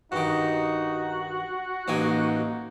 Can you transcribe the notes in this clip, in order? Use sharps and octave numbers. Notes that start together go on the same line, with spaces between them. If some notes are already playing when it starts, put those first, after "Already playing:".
G2 D#3 D#4 F#4
A1 A#3 D#4 G#5